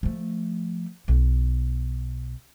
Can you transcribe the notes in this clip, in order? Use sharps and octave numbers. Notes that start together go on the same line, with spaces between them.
F3 A3
B1